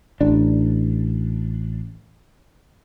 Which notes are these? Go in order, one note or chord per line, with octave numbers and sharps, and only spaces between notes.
A1 D4